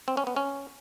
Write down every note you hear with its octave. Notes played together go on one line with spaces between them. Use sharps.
C4
C#4
B3
C#4